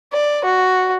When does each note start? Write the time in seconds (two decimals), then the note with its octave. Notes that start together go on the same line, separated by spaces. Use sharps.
0.13 D5
0.44 F#4